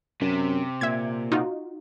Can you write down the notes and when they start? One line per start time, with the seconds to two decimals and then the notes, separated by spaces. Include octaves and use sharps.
0.21 F#2 C3
0.81 A#2 E5 G#6
1.32 D#4 F4 F#4